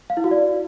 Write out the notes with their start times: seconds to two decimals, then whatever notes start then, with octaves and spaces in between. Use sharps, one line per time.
0.10 F5
0.17 E4
0.24 F#4
0.31 D5